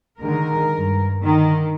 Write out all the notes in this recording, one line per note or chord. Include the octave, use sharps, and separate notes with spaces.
D3 D#3 G#3 A#4
G2
D3 D#3